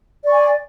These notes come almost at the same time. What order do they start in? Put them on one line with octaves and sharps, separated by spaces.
D5 C#6 G#5